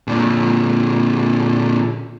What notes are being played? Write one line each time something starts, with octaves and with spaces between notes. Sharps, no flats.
A#2 D3